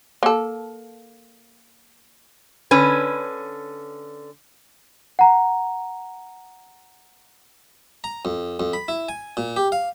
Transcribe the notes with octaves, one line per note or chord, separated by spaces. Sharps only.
A#3 A4
D3 C#4 B4
F#5 A#5
A#5
F2
F2
B5
E4
G#5
A#2
G4
F5